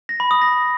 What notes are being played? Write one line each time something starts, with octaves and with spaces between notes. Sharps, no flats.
A#6
B5
D#6
A#6